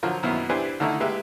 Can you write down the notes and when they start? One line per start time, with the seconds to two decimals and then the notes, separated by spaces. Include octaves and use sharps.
0.03 D3 F3 F#3 F4 A#4
0.23 F#2 B2 D#3 A#3 B3 E4
0.49 D4 E4 G4 B4 C5 G#5
0.80 D3 D#3 A3 D#4 E4
1.00 G#3 A#3 G4 B4 E5